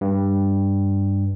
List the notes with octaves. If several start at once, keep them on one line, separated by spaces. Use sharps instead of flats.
G2